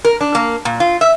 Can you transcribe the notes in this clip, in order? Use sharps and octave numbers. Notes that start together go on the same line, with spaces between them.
A#4
D4
A#3
A#2
F4
E5